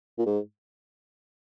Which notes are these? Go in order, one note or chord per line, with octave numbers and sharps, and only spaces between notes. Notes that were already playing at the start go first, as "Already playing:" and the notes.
A#2
G#2